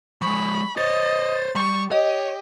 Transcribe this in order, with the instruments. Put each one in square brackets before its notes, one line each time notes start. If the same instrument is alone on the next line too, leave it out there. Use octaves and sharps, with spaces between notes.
[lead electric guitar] F3 G#3 [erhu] B5 [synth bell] C#6
[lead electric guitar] C5 C#5 [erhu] D#5 [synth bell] A6
[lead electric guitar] G3 [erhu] C#6
[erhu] G4 [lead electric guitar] C#5 [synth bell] D#5